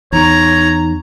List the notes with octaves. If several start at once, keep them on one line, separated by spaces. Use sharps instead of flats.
E2 D#4 C#5 A#5